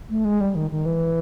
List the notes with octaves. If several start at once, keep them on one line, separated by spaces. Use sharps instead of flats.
A3
G#3
G3
D#3
D#3
E3